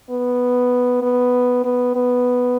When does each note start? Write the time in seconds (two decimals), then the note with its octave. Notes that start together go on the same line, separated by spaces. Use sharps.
0.10 B3
1.02 B3
1.64 B3
1.95 B3